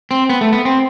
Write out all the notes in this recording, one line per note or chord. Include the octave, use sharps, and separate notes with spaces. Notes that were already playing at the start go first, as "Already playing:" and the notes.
C4
B3
A3
B3
C4